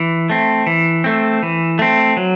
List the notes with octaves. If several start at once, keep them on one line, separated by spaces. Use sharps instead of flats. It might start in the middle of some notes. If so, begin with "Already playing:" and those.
Already playing: E3
A3 C4
E3
A3 C4
E3
A3 C4
F#3